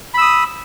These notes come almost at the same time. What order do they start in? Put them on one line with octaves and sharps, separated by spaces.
B5 E6 D#6